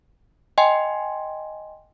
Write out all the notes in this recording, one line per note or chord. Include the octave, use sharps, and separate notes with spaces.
D#5 G5 G#5 C6